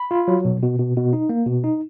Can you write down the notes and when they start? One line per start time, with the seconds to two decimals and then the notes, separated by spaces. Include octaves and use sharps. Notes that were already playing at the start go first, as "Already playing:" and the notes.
Already playing: B5
0.11 F4
0.28 F#3
0.45 B2
0.62 B2
0.79 B2
0.97 B2
1.13 D#4
1.29 A#3
1.47 B2
1.64 D#4